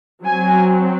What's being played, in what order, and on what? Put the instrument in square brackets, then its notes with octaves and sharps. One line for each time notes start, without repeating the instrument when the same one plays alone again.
[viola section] F#3 C4 G#5